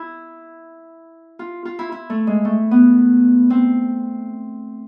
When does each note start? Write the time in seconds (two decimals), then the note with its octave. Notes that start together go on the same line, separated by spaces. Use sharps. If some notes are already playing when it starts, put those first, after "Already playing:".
Already playing: E4
1.39 F4
1.65 F4
1.79 E4
1.92 E4
2.10 A3
2.27 G#3
2.45 A3
2.71 B3
3.50 C4